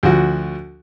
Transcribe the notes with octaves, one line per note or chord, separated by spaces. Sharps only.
D2 F3 F#4